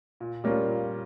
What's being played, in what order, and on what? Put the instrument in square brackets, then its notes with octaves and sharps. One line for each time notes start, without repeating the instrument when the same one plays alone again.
[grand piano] A#2
G3 A#3 C#4 F4
A#2